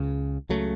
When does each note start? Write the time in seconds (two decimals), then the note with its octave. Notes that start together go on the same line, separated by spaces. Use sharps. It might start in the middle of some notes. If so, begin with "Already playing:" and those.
Already playing: C#2 C#3
0.49 C#2 C#3 F#3 A3